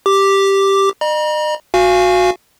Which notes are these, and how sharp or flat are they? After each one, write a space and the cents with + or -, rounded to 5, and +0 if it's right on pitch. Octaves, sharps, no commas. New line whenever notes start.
G4 +0 D6 +0
D#5 -40 A#5 +40
F#4 -20 F5 -20 G#5 +0